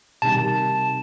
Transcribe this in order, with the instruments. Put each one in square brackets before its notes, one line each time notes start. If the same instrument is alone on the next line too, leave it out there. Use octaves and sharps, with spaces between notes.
[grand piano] C3 D#3 G3 [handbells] A5